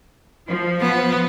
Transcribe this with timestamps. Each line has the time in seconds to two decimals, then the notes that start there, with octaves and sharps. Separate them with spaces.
0.47 F3
0.81 B3